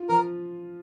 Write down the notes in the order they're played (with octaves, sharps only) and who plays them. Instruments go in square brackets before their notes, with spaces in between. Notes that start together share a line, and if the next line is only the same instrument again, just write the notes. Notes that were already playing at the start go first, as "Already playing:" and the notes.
Already playing: [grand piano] F4
[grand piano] F3 [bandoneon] A#4